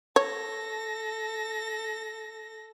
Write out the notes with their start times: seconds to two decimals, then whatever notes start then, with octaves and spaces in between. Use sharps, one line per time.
0.16 A4 C#5 A#6